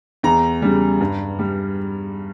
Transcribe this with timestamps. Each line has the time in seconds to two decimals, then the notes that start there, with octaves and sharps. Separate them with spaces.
0.23 E2 A#5
0.62 C#3 G3
1.01 G2
1.39 G3